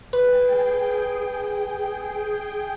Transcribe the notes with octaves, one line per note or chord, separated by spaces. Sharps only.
G#4 B4 G5